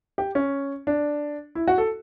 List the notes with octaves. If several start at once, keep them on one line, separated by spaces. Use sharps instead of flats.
G4
C#4
D4
E4
F#4
A4